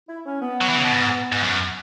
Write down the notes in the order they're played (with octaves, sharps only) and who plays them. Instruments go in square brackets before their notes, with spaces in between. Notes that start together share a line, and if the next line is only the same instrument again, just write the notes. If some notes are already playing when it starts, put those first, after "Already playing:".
[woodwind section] E4
C#4
B3
[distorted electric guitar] F#3
E3
C#3
B2
G#2
G#2
F#2